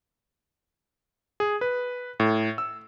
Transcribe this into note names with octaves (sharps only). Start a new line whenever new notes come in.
G#4
B4
A2
E6